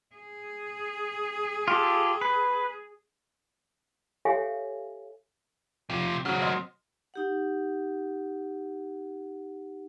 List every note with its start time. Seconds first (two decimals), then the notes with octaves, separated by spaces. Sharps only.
0.16 G#4
1.68 F4 G4 A4
2.21 B4
4.25 G4 A4 C#5 E5 F5 G#5
5.90 C3 F3
6.25 C#3 F#3 C4 F6
6.42 D#5 C6 F6
7.14 D#4 G4 F#5